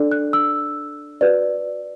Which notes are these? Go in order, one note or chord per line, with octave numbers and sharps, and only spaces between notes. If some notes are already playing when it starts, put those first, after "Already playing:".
Already playing: D4 A4 D5
F#6
E6
F#4 B4 D5